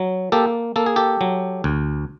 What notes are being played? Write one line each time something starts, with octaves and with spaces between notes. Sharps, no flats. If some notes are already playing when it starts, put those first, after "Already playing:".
Already playing: F#3
A#3 G4 A4
A#3 A4
G#4
G4 A4
F#3
D2